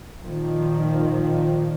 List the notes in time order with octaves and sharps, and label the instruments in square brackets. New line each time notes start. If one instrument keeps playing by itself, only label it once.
[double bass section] A#2 D#3 F3